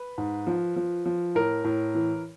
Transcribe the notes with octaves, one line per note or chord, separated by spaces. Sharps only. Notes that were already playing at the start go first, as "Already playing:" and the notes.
Already playing: B4
G#2
F3
F3
F3
A2 A#4
A2
E3